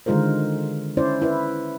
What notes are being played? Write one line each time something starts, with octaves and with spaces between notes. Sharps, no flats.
D3 D#3 G#3 F4 A#4 C5
C#4 E4 C5 D5
E4 B4